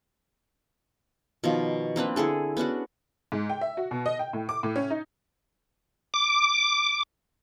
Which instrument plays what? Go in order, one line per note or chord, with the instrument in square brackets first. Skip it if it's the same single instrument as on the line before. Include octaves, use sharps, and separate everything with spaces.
[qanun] B2 D#3 F3
A#3 C4 D4 B4
D3 E4 G#4 A4
B3 C#4 D4 F#4
[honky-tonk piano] G#2
G5
E5
F#4
B2
D#5
G5
A2
D6
A2
C#4
D#4
[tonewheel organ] D6